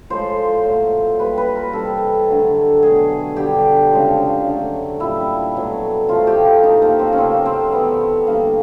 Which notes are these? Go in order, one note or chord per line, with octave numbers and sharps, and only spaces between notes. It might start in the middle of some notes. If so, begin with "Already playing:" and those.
A2 F3 G#3 C5
A#2 F#3 A3
A#2 G3 B4
B4
A#4
C3 E3 G3 A4
D3 F#3 A3
B2 F#3 A3 G#4
D3 G3 G4
C#3 F3 G#3
D3 F#3 A3
A#2 G3 E4
B2 F#3 A3
C3 F3 A3 F4
G4
G4
A#2 F3 A3 D#4
A#3
C4
C#4
C#3 F#3 A3 C4
C4
C3 E3 A3 B3
D3 G3 A#3